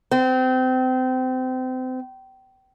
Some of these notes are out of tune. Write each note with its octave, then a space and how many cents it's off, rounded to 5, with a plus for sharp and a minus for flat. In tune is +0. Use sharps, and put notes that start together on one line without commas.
C4 -30